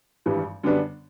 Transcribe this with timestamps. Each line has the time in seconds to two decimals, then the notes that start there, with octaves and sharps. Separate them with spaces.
0.26 G#1 G2 E3 G3
0.63 F#2 D3 G3 B3 D4